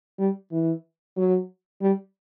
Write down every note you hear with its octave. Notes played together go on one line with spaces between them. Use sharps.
G3
E3
F#3
G3